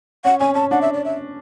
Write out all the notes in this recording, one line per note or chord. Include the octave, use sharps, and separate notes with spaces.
C#4 F#5
C#4 G#5
C#4 A5
D4 F#5
E5
D5
E5